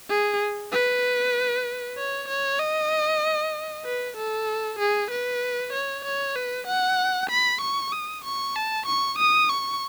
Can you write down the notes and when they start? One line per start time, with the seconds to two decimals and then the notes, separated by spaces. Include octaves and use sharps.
0.10 G#4
0.72 B4
1.98 C#5
2.28 C#5
2.59 D#5
3.85 B4
4.17 A4
4.79 G#4
5.11 B4
5.73 C#5
6.05 C#5
6.35 B4
6.67 F#5
7.30 B5
7.61 C#6
7.92 D#6
8.25 C#6
8.56 A5
8.86 C#6
9.19 D#6
9.49 C#6